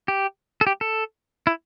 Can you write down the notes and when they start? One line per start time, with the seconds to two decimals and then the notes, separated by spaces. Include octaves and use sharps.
0.08 G4
0.61 A4
0.67 G4
0.81 A4
1.47 E4